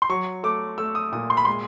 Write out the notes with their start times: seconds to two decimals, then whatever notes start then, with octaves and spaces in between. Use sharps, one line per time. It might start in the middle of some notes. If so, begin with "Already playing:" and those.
0.02 C6
0.09 F#3 C#6
0.43 A3 D6
0.78 A3 E6
0.95 D#6
1.12 A#2 D#6
1.30 C6
1.37 B5
1.45 G#3 C6